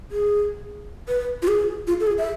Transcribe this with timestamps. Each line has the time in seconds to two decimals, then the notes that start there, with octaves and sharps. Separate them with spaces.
0.11 G#4
1.08 B4
1.42 F4
1.48 G#4
1.87 F4
2.00 A4
2.07 G#4
2.18 E5